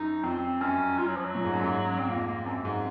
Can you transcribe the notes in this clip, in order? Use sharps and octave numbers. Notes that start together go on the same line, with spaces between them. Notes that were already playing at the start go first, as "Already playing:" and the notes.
Already playing: F#2 D#4
F2 C4
F#2 C#4
F4
F#3
F3
F#3
A#2
G#2
F#2
G#2
C4
F2 A#3
A#3
F#2 C4
G#2